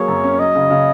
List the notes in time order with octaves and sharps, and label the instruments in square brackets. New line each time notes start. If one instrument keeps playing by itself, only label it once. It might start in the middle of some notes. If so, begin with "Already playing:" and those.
Already playing: [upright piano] F#3 A#3 G#4 [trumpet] C#5
[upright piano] F#2
C#4
[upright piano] F#3 [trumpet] D#5
[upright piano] C#3
C#3